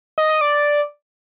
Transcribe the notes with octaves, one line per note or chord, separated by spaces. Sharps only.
D#5
D#5
D5